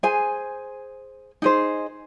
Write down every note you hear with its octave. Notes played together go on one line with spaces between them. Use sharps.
G#4 C5 G#5
D#4 G#4 C5